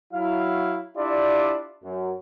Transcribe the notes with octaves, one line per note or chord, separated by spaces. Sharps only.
F#3 E4 F5
D4 E4 F4 G4 D5
F#2